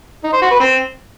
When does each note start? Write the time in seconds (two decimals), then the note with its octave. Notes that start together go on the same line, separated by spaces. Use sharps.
0.24 D#4
0.33 C5
0.42 F#4
0.51 B4
0.60 C4